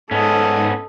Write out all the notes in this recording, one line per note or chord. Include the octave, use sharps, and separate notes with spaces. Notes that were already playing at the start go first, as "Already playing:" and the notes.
G#2 B3 C#4 A4 D#5